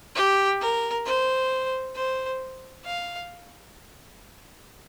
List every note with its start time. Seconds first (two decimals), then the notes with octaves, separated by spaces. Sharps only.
0.15 G4
0.61 A#4
1.05 C5
1.96 C5
2.85 F5